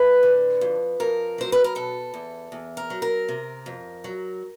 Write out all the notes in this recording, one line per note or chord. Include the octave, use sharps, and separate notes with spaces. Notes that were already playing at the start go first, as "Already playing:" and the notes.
Already playing: A2 E3 B4
D3
F2
F2 A#4
F#3 C5
B4
A#4
B2 A4
E2
E2
A#4
F#3
A#4
C3
F2
F#3